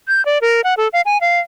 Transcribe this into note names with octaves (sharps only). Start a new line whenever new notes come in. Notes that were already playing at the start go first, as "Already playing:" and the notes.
G6
D5
A#4
F#5
A4
F5
G#5
F5